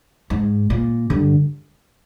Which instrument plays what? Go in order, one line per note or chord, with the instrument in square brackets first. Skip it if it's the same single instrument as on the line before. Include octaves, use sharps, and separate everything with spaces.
[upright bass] G#2
A#2
[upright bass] G2 [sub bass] D3